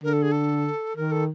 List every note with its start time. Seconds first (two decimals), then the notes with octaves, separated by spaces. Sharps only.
0.04 D3 A#4
0.13 A4
0.22 G#4
0.32 A4
0.96 D#3 A#4
1.12 A4